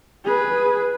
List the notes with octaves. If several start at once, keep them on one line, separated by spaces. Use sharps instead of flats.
G#4 B4